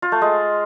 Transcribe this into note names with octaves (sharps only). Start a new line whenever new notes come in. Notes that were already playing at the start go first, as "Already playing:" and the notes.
F4
A3
G#3